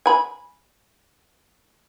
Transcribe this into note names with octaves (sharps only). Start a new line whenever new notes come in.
G#5 B5